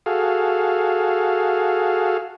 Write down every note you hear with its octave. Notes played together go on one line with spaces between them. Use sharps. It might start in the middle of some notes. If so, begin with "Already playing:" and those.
F#4 G#4 A4 F5